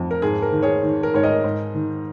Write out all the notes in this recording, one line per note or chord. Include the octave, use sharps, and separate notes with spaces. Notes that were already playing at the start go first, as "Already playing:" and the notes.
Already playing: F2
A#4
G#2 G#4
A#4
D#3
G#4 C#5
D#3
A#4
G#2 C#5
A#4 D#5
G#2
D#3